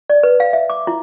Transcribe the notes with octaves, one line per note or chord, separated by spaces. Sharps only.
D5
B4
F5
E5
D6
E4